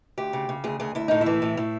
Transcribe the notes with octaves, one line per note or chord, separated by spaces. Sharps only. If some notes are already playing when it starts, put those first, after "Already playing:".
D2 G4
C#3
C#3
D2 G#4
D2 G#4
D2 E4
A2 D#4
E4
E3
A2
A2